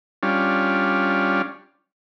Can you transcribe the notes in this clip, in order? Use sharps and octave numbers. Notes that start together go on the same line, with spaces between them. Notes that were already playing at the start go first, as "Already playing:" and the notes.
G3 C#4 D4 F4